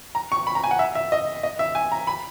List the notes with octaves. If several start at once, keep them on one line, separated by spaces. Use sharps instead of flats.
A#5
C#6
B5
A#5
G#5
F#5
E5
E5
D#5
D#5
E5
G#5
A#5
B5